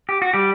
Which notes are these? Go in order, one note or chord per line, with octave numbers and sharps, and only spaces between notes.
G4
F#4
G3 G4